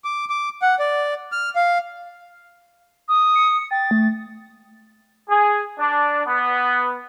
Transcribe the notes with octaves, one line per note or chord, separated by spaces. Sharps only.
D6
D6
F#5
D5
F6
F5
D#6
C#7
G5 A6
A3
G#4
D4
B3